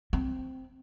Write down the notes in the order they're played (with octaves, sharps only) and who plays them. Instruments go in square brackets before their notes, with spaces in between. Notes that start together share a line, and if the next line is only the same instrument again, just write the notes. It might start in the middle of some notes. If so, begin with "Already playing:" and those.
[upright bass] C4